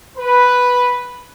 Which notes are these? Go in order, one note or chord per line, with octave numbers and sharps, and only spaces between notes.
B4